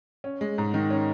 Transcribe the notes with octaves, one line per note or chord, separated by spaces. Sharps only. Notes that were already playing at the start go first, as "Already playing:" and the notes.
C#4
G#3
G#2
D#3
C#4